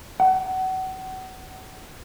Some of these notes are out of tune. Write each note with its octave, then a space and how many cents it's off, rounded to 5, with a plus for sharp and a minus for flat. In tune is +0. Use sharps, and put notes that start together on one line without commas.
F#5 +30